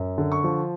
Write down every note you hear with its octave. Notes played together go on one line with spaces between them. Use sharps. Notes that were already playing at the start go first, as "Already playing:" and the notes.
Already playing: F#2
D3
C#6
F3